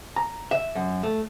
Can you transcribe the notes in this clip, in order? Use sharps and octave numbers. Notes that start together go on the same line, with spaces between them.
A#5
E5
F#2
A3